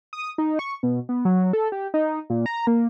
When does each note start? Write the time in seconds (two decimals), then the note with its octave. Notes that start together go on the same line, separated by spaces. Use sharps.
0.13 D#6
0.38 D#4
0.59 C#6
0.83 B2
1.09 B3
1.25 F#3
1.53 A4
1.72 G4
1.94 D#4
2.30 A#2
2.46 A#5
2.67 A#3